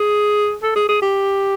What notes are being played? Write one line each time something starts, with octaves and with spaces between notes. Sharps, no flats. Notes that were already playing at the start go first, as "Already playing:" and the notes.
Already playing: G#4
A4
G#4
G#4
G4